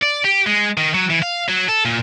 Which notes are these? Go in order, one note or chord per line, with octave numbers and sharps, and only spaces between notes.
D5
G4
G#3
D#3
F#3
E3
F5
F#3
A4
A#2